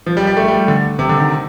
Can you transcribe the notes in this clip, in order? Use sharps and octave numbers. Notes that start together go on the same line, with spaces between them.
F3
G3
G3
A3
G3
D3
C3
D3
D#3